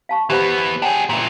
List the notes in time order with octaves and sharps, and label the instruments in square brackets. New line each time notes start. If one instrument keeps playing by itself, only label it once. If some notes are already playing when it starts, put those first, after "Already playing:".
[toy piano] F5 A5 C#6
[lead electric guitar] E3 B3 [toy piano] G4 C5 B5
[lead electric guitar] D4 G#4 [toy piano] C#5 F#5 G5
[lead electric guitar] A#2 E3